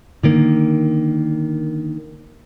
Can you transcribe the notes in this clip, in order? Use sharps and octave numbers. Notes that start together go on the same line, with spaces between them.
D3 D#3 A#3